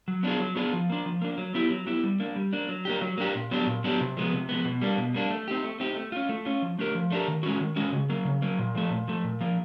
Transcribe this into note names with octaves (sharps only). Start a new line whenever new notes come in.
F#3
B3 D4 F4 G#4
F#3
B3 D4 F4 G#4
F3
A#3 D4
F3
A#3 D4
F#3
B3 E4 G4
F#3
B3 E4 G4
G3
A#3 D4
G3
A#3 D4
F#3
A#3 D4 G4
F#3
A#3 D4 G4
A#2
F#3 B3 D4 G4
A#2
F#3 B3 D4 G4
C3
F3 G#3 B3
C3
F3 G#3 B3
B2
G3 A#3 D4
B2
G3 A#3 D4
A3
C4 D#4 G4
A3
C4 D#4 G4
A3
C#4 F4
A3
C#4 F4
F3
A3 D4 G4 A#4
F3
A3 D4 G4 A#4
D#3
G#3 C#4 F#4
D#3
G#3 C#4 F#4
C#3
F#3 A#3
C#3
F#3 A#3
A#2
F3 A3
A#2
F3 A3
A#2
F3 A#3